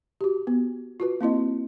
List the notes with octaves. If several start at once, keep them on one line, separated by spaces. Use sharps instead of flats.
F#4 G4
B3
F4 F#4 B4
A#3 C4 E4 D#5